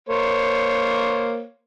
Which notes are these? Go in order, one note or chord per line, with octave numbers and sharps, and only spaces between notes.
A#3 C5 C#5